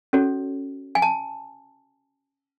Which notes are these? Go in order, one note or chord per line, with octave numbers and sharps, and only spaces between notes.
C#4 F#4 A4 C#5
G#5
A5